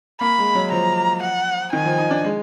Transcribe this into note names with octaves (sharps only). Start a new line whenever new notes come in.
A#3 B5
G#3
F#3
F3 A#5
F#5
D#3 G#5
F3
D#4
D4
G#3